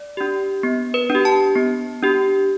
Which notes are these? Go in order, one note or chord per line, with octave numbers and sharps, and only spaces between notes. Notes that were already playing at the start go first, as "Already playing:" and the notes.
Already playing: D5
D4 G4
B3
B4
D4
G4
A5
B3
D4 G4